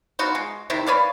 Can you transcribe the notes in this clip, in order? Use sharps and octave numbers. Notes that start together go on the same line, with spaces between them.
B3 D#4 F4 F#4
G#3
C3 D#3 E4
B4 C#5 D5 F5